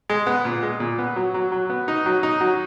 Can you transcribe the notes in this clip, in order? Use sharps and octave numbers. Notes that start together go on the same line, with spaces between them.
G#3
B3
A#2
G#3
A#2
B3
F#3
F#3
F#3
B3
D#4
F#3
D#4
F#3